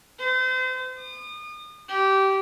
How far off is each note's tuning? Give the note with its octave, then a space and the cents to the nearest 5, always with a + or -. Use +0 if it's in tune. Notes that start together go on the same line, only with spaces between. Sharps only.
C5 -35
D#6 -35
G4 -20